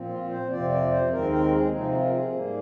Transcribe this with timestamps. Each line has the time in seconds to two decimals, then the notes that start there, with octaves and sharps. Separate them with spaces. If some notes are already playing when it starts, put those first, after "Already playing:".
Already playing: A#2 F3 C4
0.09 F4
0.29 C5
0.50 F2 C3 F3 C4 D5
0.70 D5
0.91 C5
1.11 D#2 D#3 G#3 C4 A#4
1.31 A#4
1.52 G#4
1.72 C3 F3 C4 D#4
1.92 F4
2.05 A#4
2.12 G#4
2.32 G#2 G3 A#3